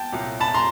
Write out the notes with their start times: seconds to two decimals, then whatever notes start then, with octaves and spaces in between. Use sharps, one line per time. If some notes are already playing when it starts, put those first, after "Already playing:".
Already playing: G5 A5
0.12 C2 A#2 F#3
0.40 A5 B5
0.54 A#5 C6